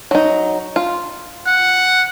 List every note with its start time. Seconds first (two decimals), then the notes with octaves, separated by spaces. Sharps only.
0.11 F#3 D#4
0.76 F4
1.47 F#5